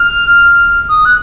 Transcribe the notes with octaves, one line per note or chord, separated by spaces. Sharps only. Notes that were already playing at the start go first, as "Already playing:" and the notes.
Already playing: F6
D#6
F#6